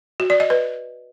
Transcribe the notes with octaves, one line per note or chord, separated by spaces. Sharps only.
F#4
D5
D#5
B4